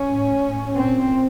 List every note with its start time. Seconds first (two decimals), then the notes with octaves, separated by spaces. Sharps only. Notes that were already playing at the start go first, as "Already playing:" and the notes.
Already playing: C#4
0.10 A2
0.43 A2
0.76 A#2 C4